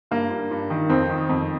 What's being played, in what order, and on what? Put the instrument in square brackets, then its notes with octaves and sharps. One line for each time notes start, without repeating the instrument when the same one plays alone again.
[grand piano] G2 A#3
G2
G2
D#3
F2 C4
D#3
F2